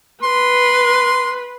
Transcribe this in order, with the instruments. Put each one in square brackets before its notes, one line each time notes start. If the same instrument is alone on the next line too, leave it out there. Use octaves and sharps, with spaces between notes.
[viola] B4 [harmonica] C6